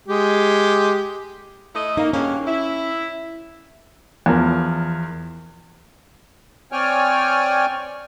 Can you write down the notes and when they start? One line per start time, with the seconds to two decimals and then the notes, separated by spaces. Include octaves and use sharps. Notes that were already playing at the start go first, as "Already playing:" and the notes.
0.08 G#3 G4
1.75 A3 E4 D#5
1.97 A#3 D#4
2.13 G2 C#3 A#3 C#4
2.47 E4
4.26 E2 F3 A#4
6.72 C4 C#5 D5 G5 G#5 F6